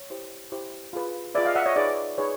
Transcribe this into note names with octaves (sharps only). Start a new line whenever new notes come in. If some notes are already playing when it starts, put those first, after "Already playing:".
Already playing: C#5
E4 G4 C5
E4 G4 C5
F4 G#4 B4
F4 G#4 B4 D5 E5
D#5 F5
E5 F#5
C#5 D#5
D#4 G#4 B4 D5
D#4 G#4 B4 C#5